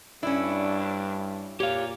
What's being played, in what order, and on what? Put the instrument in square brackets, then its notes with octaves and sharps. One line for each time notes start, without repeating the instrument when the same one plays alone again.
[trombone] G2 [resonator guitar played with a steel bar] C#4 E4 [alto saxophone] D4
[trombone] A#2 [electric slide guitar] G4 F5 [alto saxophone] C#5